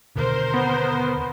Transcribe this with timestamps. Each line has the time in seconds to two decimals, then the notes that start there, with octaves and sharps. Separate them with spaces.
0.16 D#2 B2 D3 A#4 C5
0.54 B3